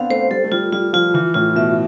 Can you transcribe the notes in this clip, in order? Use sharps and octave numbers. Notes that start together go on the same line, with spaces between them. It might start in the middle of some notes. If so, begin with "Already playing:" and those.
Already playing: B3 C4 D4 F5
A3 C5
G3 A4
A3
G3 F4
G3 F4
F3 F4
E3 F4
A2 F4
B2 E5